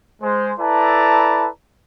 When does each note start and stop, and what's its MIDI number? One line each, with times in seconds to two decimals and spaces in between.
0.22 0.52 56
0.22 0.52 72
0.59 1.48 64
0.59 1.48 69
0.59 1.48 71
0.59 1.48 74
0.59 1.48 81
0.59 1.48 82